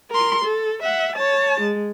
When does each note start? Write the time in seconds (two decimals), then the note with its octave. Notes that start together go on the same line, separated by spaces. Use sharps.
0.11 A#4 C6
0.45 A4
0.83 E5 F#5
1.16 C#5 A5
1.61 G#3